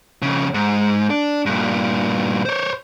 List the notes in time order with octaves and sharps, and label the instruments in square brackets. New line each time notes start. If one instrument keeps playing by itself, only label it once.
[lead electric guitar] F2 C#3
G#2
D4
G2 A#2
C5 C#5